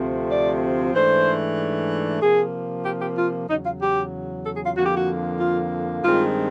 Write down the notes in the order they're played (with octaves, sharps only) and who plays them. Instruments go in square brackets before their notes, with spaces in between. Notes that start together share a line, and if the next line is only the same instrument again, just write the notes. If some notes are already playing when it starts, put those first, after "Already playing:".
Already playing: [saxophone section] D2 C3 F3 A3 C4
D5
G#2 E3 A3 D4 C5
C3 F3 A#3 G#4
G4
G4
F4
E2 C#3 F#3 D#4
F4
G4
A4
G#4
F4
F2 D3 F3 A#3 F#4
G4
F#4
F4
G2 D#3 G#3 C4 F4